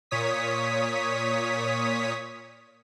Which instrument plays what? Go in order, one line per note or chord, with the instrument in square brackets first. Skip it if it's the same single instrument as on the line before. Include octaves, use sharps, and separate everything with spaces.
[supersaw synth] A#2 C#5 D#6 B6